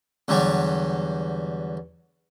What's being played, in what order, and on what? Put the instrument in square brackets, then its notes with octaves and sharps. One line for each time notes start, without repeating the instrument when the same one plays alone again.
[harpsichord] E2 D3 F#3 G3